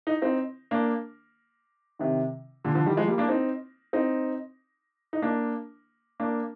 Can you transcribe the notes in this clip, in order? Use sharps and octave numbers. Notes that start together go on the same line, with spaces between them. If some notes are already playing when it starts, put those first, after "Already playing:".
D#4
C4 D#4
A#3 D4
C3 D#3
A#2 D3
D3 F3
D#3 G3
F3 G#3
G3 A#3
A#3 D4
C4 D#4
C4 D#4
D#4
A#3 D4
A#3 D4